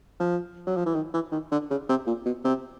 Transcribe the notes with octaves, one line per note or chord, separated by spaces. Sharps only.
F3
F#3
F3
E3
D#3
E3
D#3
D3
C#3
C3
A#2
B2
C3